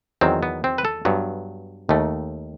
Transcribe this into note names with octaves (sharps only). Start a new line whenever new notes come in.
E2 D#3 F#3 C4
B3
C4
B4
A4
G2 F#3 B3
D#2 D#3 A3